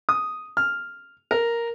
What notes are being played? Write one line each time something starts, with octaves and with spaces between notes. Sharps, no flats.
D#6
F6
A#4